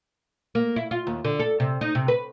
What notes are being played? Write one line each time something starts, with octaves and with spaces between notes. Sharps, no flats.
A#3
E4
F4
D#2
D3
A4
C3
D#4
C3
B4